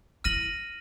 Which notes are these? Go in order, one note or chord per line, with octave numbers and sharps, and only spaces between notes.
E4 F6 A#6 D#7 F#7